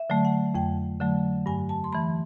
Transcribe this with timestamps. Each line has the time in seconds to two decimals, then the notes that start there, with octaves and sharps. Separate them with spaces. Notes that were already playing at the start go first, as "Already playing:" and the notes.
Already playing: E5
0.10 D3 F#3 A3
0.25 F#5
0.55 F2 G5
1.00 D3 F#3 A3
1.46 G2 G#5
1.69 A5
1.84 C6
1.92 E3 A3 B5